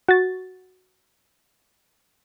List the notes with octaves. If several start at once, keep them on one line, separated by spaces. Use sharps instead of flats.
F#4 A6